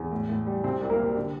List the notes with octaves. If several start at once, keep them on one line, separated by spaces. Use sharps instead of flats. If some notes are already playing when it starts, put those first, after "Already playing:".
Already playing: E2
A2
A2
G3
C3 C4 C5
C2
A#3 A#4
C3
D3